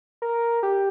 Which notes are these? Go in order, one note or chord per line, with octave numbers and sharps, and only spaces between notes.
A#4
G4